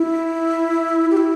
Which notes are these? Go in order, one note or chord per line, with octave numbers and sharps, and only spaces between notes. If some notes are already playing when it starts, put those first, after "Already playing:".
Already playing: E4
G4
E4